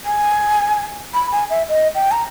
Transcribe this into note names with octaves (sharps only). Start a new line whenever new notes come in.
G#5
B5
G#5
E5
D#5
G5
A#5